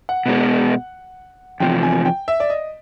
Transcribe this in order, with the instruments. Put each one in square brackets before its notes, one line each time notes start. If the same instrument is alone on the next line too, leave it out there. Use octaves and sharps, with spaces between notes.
[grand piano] F#5
[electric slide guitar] B2 G#3 B3
[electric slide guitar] E2 C3 F3 [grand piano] G5
[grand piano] G#5
G5
E5
D5
D#5